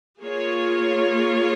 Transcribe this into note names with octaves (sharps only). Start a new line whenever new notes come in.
A#3 F4 G#4 C#5